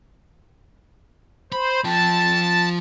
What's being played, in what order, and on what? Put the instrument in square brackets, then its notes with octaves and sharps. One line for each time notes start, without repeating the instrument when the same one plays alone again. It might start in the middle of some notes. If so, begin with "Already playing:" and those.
[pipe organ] C5 [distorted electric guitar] B5
[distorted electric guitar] F3 G5 [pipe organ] A5